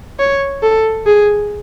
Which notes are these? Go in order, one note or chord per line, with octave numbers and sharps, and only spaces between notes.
C#5
A4
G#4